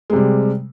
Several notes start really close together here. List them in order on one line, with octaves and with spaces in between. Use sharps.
G#3 C3 G3